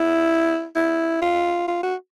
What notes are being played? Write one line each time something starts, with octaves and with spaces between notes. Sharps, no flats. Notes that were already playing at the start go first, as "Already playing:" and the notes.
Already playing: E4
E4
F4
F4
F#4